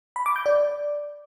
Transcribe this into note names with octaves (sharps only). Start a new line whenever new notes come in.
B5
D6
G6
D5